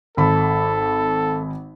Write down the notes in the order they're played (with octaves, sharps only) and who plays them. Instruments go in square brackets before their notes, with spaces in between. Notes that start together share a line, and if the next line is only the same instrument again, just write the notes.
[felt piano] G#1 B5 [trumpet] A4